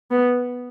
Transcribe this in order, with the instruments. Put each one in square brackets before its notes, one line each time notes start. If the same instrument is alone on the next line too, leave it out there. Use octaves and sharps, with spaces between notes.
[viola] B3